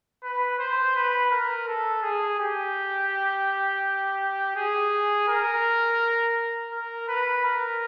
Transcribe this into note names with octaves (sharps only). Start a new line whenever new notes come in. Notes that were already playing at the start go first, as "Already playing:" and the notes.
B4
C5
B4
A#4
A4
G#4
G4
G#4
A#4
A#4
B4
A#4